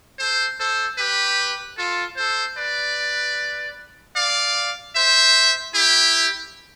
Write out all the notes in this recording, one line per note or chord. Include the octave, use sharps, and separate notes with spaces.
A4 C5
A4 C5
G4 B4
F4 A4
A4 C5
B4 D5
D5 F5
C5 E5
E4 G4